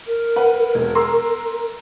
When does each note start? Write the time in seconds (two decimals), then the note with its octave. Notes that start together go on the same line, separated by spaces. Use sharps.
0.06 A#4
0.36 B4 F#5
0.75 E1
0.95 A#5 C6 E6